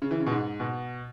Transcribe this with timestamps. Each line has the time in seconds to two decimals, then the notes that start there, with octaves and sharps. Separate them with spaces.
0.02 C#3
0.11 E3
0.20 C#3
0.26 B2
0.31 G#2
0.60 B2